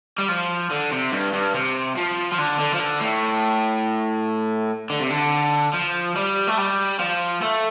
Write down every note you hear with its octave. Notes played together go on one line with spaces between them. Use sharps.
G3
F3
D3
C3
G2
G2
C3
F3
F3
D3
D3
F3
D3
A2
D3
C3
D3
F3
G3
A3
G3
F3
A3